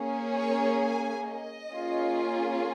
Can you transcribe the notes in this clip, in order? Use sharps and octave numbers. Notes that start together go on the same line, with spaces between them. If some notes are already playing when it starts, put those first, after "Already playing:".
Already playing: A#3 C#4 G#4
C#5
G#5
D#5
A#3 C#4 F4 G#4